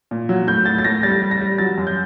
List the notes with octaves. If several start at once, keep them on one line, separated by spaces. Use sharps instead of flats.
A#2
F#3
A2 G6
A2 A6
A6
A2 A#6
G3 A6
G3
A#6
G3
F#3 A6
F#2
G6